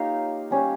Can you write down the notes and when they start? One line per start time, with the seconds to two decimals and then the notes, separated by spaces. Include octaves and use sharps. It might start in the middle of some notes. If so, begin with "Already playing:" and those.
Already playing: A#3 D#4 F4 G4 C#5 F5
0.51 G3 C#4 G4